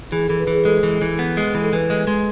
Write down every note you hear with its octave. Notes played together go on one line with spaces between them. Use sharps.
E3 G#4
E3 A4
B4
E3 G#4
G#3 A4
E3
E3
B3
G#3
E3
A4
E3 B4
G#3
G#3